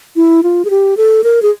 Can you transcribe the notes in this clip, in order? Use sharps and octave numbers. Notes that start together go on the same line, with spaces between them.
E4
F4
G#4
G4
A4
A#4
G#4